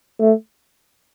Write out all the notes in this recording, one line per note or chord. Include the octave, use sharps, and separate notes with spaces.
A3